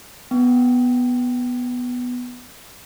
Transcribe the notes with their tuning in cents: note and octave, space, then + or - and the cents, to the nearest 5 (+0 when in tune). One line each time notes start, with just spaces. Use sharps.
B3 +0 G5 -15